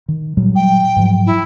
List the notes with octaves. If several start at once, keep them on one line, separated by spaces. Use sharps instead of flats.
D#3
A#2 F#3 G3
G5
G#2 F3 F#3
E4